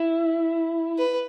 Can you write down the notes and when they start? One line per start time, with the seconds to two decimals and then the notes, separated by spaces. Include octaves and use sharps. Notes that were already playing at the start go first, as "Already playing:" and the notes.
Already playing: E4
0.98 B4